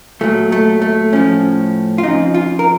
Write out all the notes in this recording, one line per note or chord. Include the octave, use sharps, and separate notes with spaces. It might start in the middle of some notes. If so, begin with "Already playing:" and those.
A#2 F#3 A3
A3
A3
A2 F3 C#4
F4
F2 C#3 F3 D#4
F4
A#4